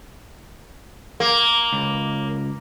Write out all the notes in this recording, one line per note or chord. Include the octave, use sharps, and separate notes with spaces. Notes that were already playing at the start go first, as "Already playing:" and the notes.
A#3
C#2